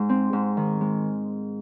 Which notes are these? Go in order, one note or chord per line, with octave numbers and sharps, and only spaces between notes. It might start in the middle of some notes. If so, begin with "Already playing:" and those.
Already playing: G#2 G#3
C4
G#2
D#3
G#3